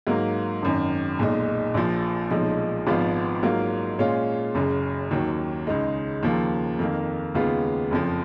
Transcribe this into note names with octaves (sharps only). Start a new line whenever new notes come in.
G#2 F#3 A#3
G#1 F#2 D#3
B1 A#2 G#3 D#4
A#1 A#2 F3
B1 A#2 F3 G#3 D#4
G#1 G#2 F3 B3 F4
G#2 F#3 A#3 F4
A#2 G#3 C#4 F4
F#1 F#2 C#3
D#2 D#3 F#3
C#2 C#3 G#3 D#4
D#2 C#3 F3 A#3
F2 D#3 A#3
D#2 C#3 G#3 B3 F4
F#1 F2 F3